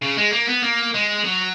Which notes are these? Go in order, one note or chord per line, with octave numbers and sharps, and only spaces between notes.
C#3
G#3
A#3
B3
A#3
G#3
F#3